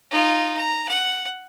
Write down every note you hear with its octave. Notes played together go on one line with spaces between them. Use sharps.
D#4 F4
A#5
F#5